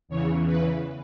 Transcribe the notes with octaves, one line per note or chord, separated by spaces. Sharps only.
E2 C#3 E3 C#5
B4